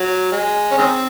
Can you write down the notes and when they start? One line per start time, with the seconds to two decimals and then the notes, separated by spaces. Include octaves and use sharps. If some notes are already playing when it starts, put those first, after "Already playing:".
Already playing: F#3
0.32 G#3
0.72 C#4
0.78 D#3 G#3 C4